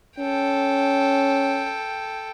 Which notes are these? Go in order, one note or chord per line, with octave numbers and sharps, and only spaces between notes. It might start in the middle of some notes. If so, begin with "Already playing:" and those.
C#4 A4 G5